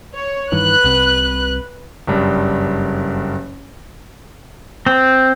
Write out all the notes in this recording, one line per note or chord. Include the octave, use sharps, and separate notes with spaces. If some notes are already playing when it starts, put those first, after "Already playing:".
C#5
G2 D#3 E3 B4 F#6
C2 C3
F#1 G2
C4